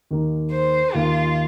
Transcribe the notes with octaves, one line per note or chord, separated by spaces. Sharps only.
D#2 D#3 A#3 D#4
C5
D#2 D#3 A#3 D#4 F4